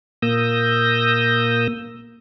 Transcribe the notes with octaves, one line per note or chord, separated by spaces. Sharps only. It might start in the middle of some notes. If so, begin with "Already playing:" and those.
A#2 A#3 D#6 E6 G6 A#6